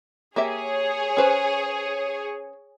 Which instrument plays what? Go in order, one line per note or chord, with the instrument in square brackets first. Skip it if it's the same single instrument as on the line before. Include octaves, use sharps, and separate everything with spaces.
[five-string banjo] A#3 G4 E5 [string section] G#4 C#5
[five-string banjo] C#4 B4 C5